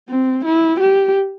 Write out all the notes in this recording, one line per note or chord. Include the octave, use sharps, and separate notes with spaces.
C4
E4
G4